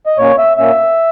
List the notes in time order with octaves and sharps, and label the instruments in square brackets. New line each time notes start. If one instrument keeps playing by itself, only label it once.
[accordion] D#5
A#2 A#3 C#4 C#5
E5
A#2 A#3 C#4 E5